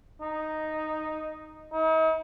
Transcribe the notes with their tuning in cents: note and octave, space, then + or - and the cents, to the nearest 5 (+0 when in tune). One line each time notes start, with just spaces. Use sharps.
D#4 -5
D#4 +45